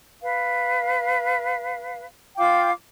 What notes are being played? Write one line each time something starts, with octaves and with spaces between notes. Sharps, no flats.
B4 F5
F4 F5 G5 D6